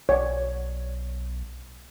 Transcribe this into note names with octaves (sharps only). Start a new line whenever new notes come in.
B1 C#5 D5